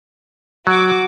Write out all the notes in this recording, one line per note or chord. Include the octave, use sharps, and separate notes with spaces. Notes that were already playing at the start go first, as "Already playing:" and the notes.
F#3 F#4 D6